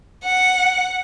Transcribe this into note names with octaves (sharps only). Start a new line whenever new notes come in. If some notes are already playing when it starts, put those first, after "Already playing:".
F#5